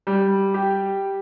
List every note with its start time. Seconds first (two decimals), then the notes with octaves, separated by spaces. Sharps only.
0.07 G3
0.54 G4